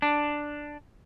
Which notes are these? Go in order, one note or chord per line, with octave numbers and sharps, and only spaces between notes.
D4